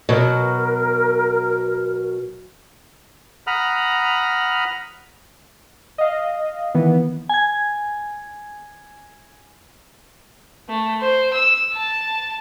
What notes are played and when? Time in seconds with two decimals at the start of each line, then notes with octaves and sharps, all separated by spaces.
0.09 B2 F#3 A#4
3.47 F#5 A#5 B5 D#6 F6
5.98 D#5 F5
6.75 D#3 E3 B3
7.29 G#5 G#6
10.69 A3
11.01 C5
11.33 E6
11.72 A5